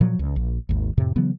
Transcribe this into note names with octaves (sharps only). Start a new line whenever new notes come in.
A#2 F3 F#3
C#2
A#1
G#1 D#2
F2 A2 C3
C#3 E3 F#3 B3